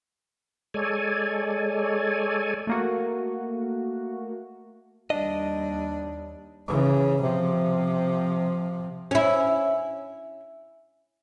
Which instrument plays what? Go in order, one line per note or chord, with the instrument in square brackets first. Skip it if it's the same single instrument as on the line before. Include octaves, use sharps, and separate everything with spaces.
[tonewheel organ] G#3 A4 C#5 D5 G#5
[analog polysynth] A3 A#3 F#4
[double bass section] D#2 G3 [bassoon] D4 [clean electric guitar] D#5
[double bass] C#3 E3
C3 F3
[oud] C#4 E4